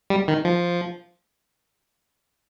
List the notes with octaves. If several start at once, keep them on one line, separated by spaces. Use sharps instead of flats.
G3
D#3
F3